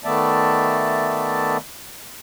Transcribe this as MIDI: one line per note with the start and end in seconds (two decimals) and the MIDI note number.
0.04 1.57 51
0.04 1.57 57
0.04 1.57 59
0.04 1.57 74
0.04 1.57 76
0.04 1.57 81